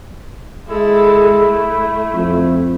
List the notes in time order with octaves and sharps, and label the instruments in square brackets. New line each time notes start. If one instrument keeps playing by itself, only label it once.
[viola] G#3 A4 [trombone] E4
[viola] A3
[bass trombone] F2